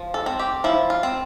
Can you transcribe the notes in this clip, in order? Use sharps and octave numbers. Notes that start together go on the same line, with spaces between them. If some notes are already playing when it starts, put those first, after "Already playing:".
Already playing: F3
A4
C4
G4
F3 E4
F4
C4